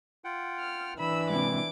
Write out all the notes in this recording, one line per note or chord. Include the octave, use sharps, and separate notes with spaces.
F4 F#5 G5
F6
E3 D4 B5 E6
G#2 C3 E4 D6